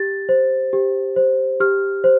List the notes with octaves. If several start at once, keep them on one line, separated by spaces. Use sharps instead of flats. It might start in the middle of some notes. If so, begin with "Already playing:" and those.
Already playing: G4 A6
C5
G4
C5
G4 F6
C5